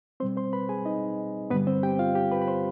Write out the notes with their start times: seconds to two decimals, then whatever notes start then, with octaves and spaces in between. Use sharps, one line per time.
0.20 B2 G3 C4 C5 C6
0.37 C5 C6
0.53 B4 B5
0.69 G#4 G#5
0.85 D#4 D#5
1.50 G2 D3 G3 B3 B4
1.67 C4 C5
1.83 G4 G5
1.99 F4 F5
2.15 G4 G5
2.31 B4 B5
2.42 B5
2.48 C5 C6